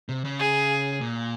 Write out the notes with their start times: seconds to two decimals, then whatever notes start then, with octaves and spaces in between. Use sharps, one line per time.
0.09 C3
0.24 C#3
0.39 G#4
1.01 A#2